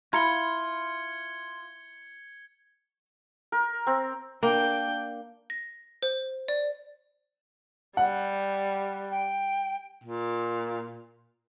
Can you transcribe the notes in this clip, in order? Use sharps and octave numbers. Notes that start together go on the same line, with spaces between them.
E4 F4 A#5 B5 G#6 C#7 G7
A#4
C4
A#3 D4 G5
A#6
C5
D5
G3 F#5
G5
A#2